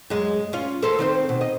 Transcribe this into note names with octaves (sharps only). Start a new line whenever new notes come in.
F#2 G#3
C#4 F4
A4 A#4 C5
D#3 C4 C5
B2
D#5